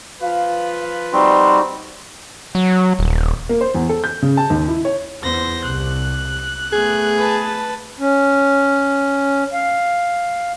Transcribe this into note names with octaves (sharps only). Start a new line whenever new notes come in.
F3 F4 B4 F5
G3 C4 D#4 F#4 C6
F#3
D#1
A#3
C5
E2
A4
G6
C#3
A5
D#2
E4
C#5
E2 B3 C5 A#6
C2 C3 F#6
A3 B3 G#4
B4 A5
C#4
F5